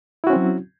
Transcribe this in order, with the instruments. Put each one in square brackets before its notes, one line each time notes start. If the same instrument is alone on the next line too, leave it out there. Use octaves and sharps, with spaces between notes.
[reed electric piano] E4
F#4
C#4
C4
F#3